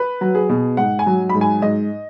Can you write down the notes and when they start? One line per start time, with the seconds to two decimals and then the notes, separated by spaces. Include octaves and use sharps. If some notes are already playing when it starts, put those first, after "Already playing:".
Already playing: B4
0.21 F#3
0.35 G#4
0.49 B2
0.77 G#2 F#5
0.99 G#5
1.06 F#3
1.29 B5
1.34 G#2
1.41 G#5
1.62 G#2 D#5